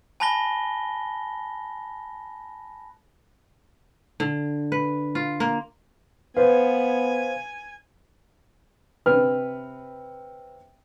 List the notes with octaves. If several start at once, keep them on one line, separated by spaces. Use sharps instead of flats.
G#5 A5 B5 F#6 A#6 G7
D3
B4
F4
A#3
B3 B4 C5 F5 G#5
C3 B4 F6